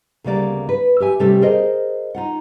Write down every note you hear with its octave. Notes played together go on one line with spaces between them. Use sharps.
D2 C#3 G3 A#3 D5
B4
G4 E5 G#5
C3 G3 A3 C#4 G4 A4
G#4 A#4 C5 D#5
D#4 F4 F#5